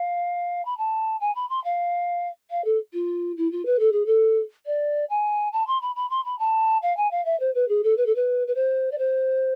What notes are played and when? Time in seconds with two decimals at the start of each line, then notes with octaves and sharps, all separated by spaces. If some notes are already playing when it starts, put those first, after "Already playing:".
Already playing: F5
0.65 B5
0.78 A5
1.21 G#5
1.35 B5
1.49 C6
1.64 F5
2.51 F5
2.65 A4
2.93 F4
3.37 E4
3.52 F4
3.66 B4
3.79 A4
3.92 G#4
4.06 A4
4.66 D5
5.10 G#5
5.53 A5
5.67 C6
5.82 B5
5.96 B5
6.10 C6
6.25 B5
6.39 A5
6.82 F5
6.97 G#5
7.11 F5
7.25 E5
7.40 C5
7.55 B4
7.69 G#4
7.84 A4
7.97 B4
8.06 A4
8.16 B4
8.48 B4
8.55 C5
8.92 D5
8.98 C5